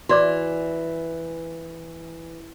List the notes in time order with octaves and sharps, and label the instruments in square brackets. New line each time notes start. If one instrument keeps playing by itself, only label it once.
[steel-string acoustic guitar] E3 [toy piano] F#4 D5 D6